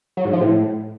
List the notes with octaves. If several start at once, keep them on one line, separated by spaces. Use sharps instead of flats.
F#3
G#2
F3
A2